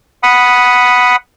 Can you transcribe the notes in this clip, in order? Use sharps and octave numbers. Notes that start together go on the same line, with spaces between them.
F#5 B5 D#6